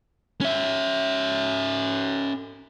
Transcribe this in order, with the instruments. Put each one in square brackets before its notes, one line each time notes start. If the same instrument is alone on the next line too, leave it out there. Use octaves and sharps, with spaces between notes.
[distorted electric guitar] C#4 E5